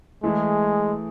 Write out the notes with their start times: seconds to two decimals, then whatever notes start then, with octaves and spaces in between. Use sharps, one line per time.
0.23 E3 G#3 A3 E4 G#4